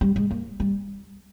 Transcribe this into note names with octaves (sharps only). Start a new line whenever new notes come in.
G3
G#3
A#3
G3